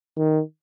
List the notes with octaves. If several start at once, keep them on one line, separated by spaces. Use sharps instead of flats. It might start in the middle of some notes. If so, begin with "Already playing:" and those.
D#3